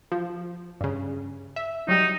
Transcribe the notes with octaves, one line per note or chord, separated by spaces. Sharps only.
F3
G2 C#3
E5
F#3 G3 D#4